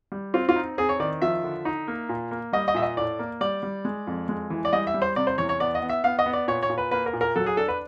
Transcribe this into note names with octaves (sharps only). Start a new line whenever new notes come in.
G3
C4 F4
F4
D#4
C4 G#4
C#5
D#3 D5
F3 E5
D3
D#4
A#3
A#2
A#3
G3 D#5
D#5
A#2 E5
D#5
A2 D5
A#3
G3 D5
G3
G#3
F2
G#3
E3
D5
G3 D#5
E5
G3
C5
C3 D5
C5
E2 C#5
C#5
B3 D5
D#5
B3
E5
B3 F5
D#5
B3
D5
A#2 C#5
C#5
A#2
B4
A#3 B4
A#4
A#2
A#4
F#3 A4
G#4
D4 A4
B4